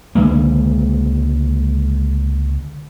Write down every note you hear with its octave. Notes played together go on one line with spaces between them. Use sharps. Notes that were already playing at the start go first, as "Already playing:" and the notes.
C#2 D3 G#3 A#3